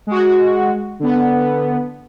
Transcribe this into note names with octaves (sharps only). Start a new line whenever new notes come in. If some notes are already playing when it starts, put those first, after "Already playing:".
G#3 F#4
D3 B3